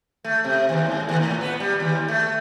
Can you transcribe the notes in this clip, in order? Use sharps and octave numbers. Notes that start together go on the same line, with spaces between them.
A3
C3
D#2
G#2
D#2
A2
B3
G3
D#2
A3